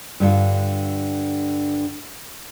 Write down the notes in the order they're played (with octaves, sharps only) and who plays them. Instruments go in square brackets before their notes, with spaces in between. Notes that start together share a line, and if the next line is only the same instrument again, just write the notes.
[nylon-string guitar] G2 D3 F4